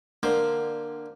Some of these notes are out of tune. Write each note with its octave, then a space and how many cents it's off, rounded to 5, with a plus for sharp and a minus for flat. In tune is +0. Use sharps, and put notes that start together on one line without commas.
D3 +20 A#3 +0 C5 +0